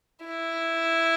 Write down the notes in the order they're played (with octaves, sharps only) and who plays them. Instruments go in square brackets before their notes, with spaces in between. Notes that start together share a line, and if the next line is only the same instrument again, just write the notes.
[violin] E4